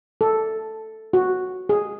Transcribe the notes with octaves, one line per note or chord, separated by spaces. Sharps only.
A4
F#4
G#4